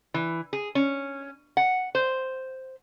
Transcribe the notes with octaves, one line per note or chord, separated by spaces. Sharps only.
E3
G#4
C#4
F#5
C5